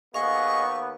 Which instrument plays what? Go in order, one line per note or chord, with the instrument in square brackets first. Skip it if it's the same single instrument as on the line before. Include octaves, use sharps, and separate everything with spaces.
[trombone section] D#2 B3 [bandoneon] G#4 D#5 [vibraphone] F5 [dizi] C#6